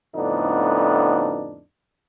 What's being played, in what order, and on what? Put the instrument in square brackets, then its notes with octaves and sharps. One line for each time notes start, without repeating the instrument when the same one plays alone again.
[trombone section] F2 A2 D3 B3 D4 D#4